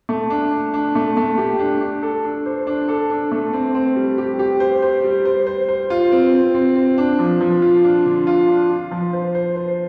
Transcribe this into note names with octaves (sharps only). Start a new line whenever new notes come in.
A3
D4
D4
D4
A3
A3
G4
D4
D4
A4
D4
C5
D4
A4
D4
A3
C4
C4
G3
G4
G4
C5
C5
G3
C5
C5
C5
F4
C4
C4
C4
C4
D4
F3
F3
F4
D4
D3
F4
D4
F4
F3
C5
C5
C5